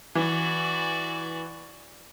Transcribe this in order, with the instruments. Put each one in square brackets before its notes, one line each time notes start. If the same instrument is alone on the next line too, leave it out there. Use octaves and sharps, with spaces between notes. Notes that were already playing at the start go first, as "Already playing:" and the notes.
[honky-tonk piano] E3 [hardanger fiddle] F#4 D5